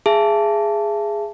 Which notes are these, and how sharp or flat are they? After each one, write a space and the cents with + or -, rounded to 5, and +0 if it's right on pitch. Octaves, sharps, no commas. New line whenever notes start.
G#4 +0 E5 +35 A5 +0